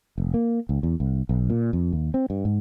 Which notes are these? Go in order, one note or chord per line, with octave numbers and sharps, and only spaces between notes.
F1
A#3
C#2
E2
C2
B1
A#2
F2
D#2
C4
G2
G#2